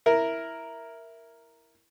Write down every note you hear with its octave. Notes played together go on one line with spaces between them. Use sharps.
E4 A#4